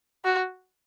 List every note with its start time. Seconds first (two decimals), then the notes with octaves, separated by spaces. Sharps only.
0.25 F#4